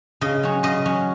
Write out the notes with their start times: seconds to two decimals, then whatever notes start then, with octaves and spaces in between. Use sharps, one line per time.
0.21 C#3 D#5
0.43 F#3 C#4
0.63 C#3 D#5
0.86 F#3 C#4